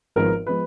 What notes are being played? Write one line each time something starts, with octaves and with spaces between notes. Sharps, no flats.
G#1 G#2 F3 B3 A#4
F3 G#3 B3 B4